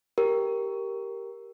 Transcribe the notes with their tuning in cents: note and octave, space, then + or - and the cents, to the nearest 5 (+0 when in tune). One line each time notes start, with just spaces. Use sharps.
G4 +0 A#4 +0